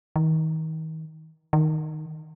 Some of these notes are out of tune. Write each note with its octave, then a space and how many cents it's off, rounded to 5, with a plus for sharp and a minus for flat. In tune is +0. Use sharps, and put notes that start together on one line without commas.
D#3 +35
D#3 -5